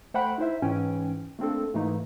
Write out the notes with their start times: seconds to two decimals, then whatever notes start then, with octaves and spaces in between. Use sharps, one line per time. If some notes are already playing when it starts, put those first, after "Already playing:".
0.14 A3 C5 F#5 G5 B5 F#6
0.38 D#4 E4 C5 E5
0.62 G#2 E3 C#4 G5 G#5
1.39 A3 A#3 C4 D4 A4
1.74 G#2 E3 A3 A#3 D#4